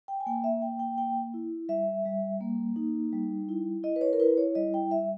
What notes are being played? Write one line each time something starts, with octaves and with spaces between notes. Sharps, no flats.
G5
G#5
A#3 G5
E5
A#3 G5
G5
A#3 G5
E4
G3 E5
G3
A#3
D#4
G3
E4
E4 D#5
B4
C#5
A#4
E4 B4
C#5
G3 D#5
G5
G3 E5